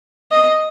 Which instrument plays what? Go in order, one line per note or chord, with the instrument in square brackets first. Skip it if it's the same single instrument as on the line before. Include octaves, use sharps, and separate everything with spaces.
[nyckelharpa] D#5